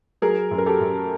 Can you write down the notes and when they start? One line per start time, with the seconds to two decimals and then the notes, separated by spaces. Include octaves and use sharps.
0.22 F#3 G#4 A#4
0.51 F#2
0.58 A#4
0.66 G4 A4
0.81 F#2